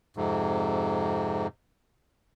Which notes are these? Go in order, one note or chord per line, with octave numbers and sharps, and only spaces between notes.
F2 G#2 C3